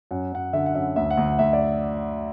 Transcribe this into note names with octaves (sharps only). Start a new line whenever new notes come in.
F#2 F#5
F#2 F#5
D3 E5
F#5
F#2 E5
D2 E5
F#5
D2
D2 E5
D5